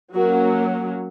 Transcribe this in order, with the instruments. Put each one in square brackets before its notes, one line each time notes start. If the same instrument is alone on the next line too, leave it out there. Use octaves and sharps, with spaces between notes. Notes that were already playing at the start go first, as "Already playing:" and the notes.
[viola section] F#3 A#3 C#4 F#4 A#4